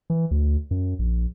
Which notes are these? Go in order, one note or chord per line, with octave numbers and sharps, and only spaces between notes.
E3
D2
F#2
A#1